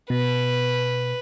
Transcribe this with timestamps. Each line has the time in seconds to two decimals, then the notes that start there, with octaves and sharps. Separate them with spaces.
0.10 B2 B4